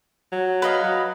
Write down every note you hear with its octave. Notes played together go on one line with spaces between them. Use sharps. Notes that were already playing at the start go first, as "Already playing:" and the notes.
F#3
B4 D#5 F5
F#3